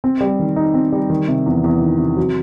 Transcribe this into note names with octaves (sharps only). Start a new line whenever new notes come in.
C4
G3
D#3
D#4
C4
G3
D#3
C3
E2
E2
D#3
C3
F#3